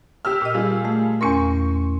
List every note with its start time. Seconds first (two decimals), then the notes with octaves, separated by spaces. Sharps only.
0.25 G4 E6 F6
0.42 A#2 D#5
0.54 G3 F4 G#4
0.85 A3
1.21 E2 C#4 A#4 C6 C#6 C#7